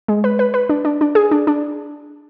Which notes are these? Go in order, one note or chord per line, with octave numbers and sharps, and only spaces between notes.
G#3
B4
B4
B4
D4
D4
D4
G#4
D4
D4